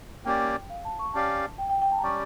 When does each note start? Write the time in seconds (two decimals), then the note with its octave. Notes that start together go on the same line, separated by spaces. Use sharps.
0.25 A#3 C#4 G4 D5 G5
0.70 F5
0.85 A5
0.99 C#6
1.14 C#4 G4 D5 F5 A5
1.58 G5
1.69 G5
1.82 G5
1.92 A5
1.99 A#5
2.03 G3 C#4 G4 D5 C#6